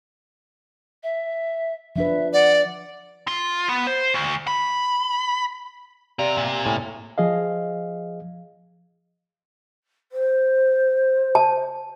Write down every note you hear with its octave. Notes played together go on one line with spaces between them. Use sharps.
E5
F3 D4 B4 E5
D5 F#5
F4
B3
C5
D2
B5
C3 G4 A#4 D5 F5
A#2
A2 G#5
F3 G#4 D#5 F5
C5
A5